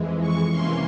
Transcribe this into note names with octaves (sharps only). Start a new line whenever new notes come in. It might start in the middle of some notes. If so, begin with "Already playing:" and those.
Already playing: F2 E3 G#3
C#6
C3 E3 A#3 C#4 C6